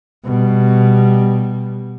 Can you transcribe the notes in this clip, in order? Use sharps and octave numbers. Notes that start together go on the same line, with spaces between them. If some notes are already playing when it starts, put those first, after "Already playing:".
B2 G3